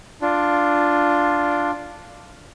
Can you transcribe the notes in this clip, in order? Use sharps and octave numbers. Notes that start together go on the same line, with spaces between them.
D4 F4